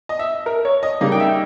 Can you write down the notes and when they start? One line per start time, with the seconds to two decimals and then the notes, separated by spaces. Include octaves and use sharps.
0.09 D#5
0.19 E5
0.46 A#4
0.65 C#5
0.83 D#5
1.01 C#3 G3 A#3 D#4 D#5
1.12 G5
1.20 E5